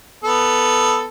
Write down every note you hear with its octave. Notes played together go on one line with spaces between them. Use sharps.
B3 A4